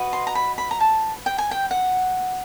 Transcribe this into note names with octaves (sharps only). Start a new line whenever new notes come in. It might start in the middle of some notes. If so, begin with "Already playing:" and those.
Already playing: F#4 B4 D#5
C6
A#5
B5
B5
A#5
A5
G5
G#5
G5
F#5